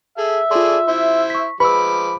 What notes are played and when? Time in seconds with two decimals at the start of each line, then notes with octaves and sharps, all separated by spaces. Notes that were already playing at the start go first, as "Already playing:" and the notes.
0.18 G#4 A4 E5
0.51 F4 G#4 A4 D5 C6
0.88 E4 C5
1.30 C#6 B6
1.60 F3 G#3 B4 B5 D6 E6